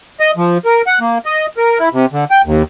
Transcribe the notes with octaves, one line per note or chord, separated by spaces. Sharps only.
D#5
F3
A#4
F#5
A#3
D#5
A#4
E4
C3
D3
G5
D#2